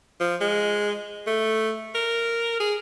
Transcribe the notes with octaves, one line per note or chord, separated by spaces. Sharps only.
F3
G#3
A3
A#4
G#4